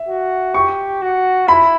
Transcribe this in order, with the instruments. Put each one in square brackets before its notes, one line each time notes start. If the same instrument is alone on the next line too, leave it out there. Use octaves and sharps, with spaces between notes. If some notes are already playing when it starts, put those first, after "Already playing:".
Already playing: [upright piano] E5
[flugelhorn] F#4
[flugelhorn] G4 [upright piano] C#6
[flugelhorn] F#4
[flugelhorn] E4 [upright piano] B5